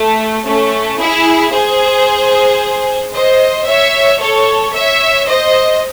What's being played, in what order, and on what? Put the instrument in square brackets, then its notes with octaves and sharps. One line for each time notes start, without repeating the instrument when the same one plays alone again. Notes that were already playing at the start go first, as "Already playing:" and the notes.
Already playing: [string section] A3
A3 C#4
E4 G#4
G#4 C5
C5 D#5
C#5 E5
A4 C#5
C#5 E5
C5 D#5